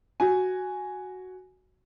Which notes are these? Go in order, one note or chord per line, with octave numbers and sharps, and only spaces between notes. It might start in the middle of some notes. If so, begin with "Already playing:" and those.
F#4 G#5